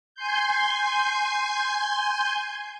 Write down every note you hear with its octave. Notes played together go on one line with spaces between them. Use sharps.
G#5 C6 G6